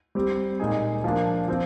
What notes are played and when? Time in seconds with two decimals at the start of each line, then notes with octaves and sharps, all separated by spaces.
0.15 G3 C4 G4
0.60 A#2 G#3 D#4 G#4
1.04 F3 A#3 D4
1.48 F3 C4